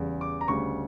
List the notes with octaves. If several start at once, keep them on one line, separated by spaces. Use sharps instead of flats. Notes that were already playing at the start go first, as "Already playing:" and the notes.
Already playing: E2 C#3 G3
D6
A#5
D2 C#3 G3 C#6